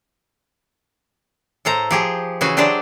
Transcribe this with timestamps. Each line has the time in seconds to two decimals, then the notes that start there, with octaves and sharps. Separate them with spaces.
1.65 A2 A4 C5 A#5
1.91 F3 G4 G#4
2.41 C#3 E3 F#4 G#4 E5 G#5
2.57 F#3 D4 G4 G#4 C5 D5